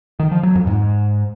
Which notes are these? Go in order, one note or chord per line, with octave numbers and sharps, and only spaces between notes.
D#3
F3
F#3
F2
G#2